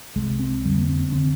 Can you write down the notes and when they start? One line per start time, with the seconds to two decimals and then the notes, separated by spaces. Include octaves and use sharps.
0.16 C2 C3 G#3
0.39 C4
0.64 F2 D3 G3
0.77 A#3
0.89 C4
1.00 C4
1.12 D3 C4